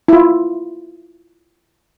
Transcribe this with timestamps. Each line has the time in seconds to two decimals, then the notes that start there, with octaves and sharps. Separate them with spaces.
0.08 E4 F4